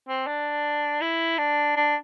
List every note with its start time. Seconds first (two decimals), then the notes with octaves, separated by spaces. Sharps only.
0.08 C4
0.27 D4
1.01 E4
1.38 D4
1.76 D4